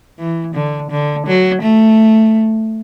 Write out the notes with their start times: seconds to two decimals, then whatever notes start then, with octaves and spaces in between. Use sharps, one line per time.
0.19 E3
0.54 D3
0.91 D3
1.27 F#3
1.62 A3